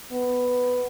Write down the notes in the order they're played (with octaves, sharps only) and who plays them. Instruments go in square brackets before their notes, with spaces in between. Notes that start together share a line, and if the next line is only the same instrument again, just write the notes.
[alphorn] B3